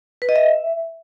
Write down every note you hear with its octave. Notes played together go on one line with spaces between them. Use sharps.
B4
D#5
E5